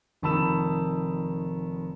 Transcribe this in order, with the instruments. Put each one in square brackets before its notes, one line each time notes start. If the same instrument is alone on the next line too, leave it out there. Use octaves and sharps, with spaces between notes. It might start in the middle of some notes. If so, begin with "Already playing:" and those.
[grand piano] F1 D#3 A5 B5 E6 E7